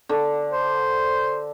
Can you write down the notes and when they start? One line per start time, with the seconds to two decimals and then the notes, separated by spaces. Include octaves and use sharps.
0.09 D3
0.52 C5